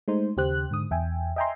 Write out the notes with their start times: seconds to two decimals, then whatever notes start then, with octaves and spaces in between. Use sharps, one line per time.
0.08 G#3 A3 D#4 C5
0.37 D#2 C#3 G4 C5 F#6
0.71 G#2 D3 D#6
0.91 E2 E5 G5 G#5
1.36 D#5 E5 G5 G#5 A#5 C6